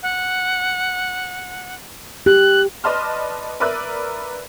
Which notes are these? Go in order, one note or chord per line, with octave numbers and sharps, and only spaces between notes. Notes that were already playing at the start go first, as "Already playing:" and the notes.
F#5
G4 F#6
B4 D5 D#5 A5 C6 F6
A#4 B4 D5 E5 B5 F#6